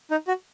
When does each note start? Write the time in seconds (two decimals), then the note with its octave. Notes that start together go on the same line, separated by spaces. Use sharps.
0.11 D#4
0.28 F#4